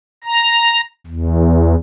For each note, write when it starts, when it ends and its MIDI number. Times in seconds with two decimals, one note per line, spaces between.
0.24 0.81 82
1.07 1.75 40